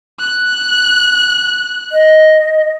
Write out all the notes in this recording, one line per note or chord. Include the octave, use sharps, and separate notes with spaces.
F#6
D#5